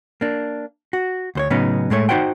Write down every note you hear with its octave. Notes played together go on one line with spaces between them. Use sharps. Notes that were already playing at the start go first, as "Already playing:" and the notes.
A#3 D4
F#4
D2 C5 C#5
A2 C#3 F#3 B3 C#4 D#4
A2 G#3 A3 C#5
D#4 F#4 C5 F#5 G5